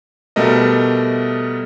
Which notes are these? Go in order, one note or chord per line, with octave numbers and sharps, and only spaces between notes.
B2 G3 A3 A#4 D#5